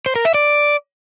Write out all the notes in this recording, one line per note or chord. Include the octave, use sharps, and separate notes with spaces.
C5
A#4
E5
D5